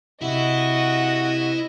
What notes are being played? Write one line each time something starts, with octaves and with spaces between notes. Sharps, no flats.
C3 E4 F#4 D#5